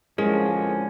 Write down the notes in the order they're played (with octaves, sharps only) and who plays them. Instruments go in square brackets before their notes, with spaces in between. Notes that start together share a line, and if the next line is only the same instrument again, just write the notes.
[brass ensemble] F2 D3 F3 [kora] G#3 [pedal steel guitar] C#4 [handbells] E4 A#4